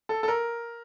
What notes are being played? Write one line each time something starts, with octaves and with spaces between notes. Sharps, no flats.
A4
A4
A#4